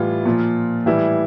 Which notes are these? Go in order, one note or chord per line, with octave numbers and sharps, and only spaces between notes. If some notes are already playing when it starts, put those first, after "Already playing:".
Already playing: A2 E3 G3 F4
A#2 F3
A2 E3 G3 E4